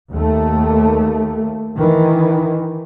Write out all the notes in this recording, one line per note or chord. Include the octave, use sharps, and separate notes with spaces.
D#2 A3
D#3 E3